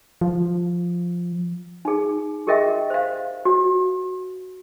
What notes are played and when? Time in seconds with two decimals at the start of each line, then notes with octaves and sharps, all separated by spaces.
0.21 F3
1.85 D#4 G#4
2.47 G4 G#4 A#4 D#5 E5 G5
2.90 C5 F5
3.45 F#4